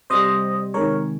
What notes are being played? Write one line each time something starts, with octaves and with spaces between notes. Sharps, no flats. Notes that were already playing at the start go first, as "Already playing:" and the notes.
C3 G3 C5 D#5
C3 D#3 G#3 A#4 C#5